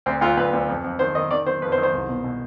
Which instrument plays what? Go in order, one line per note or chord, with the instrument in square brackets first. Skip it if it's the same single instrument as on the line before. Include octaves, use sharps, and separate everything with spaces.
[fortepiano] D2 C4
D2 F4
D2 B4
D2
F2
F2
D#3 C5
D#3 D#5
D#3 D5
D#3 C5
F2 B4
C5
D#3
C5
C2
B2
B2